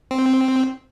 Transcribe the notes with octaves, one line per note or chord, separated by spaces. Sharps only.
C4